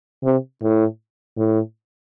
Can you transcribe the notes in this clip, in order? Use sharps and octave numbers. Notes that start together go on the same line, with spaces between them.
C3
A2
A2